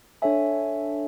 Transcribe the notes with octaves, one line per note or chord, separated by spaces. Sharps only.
D4 A4 C#5 E5 G#5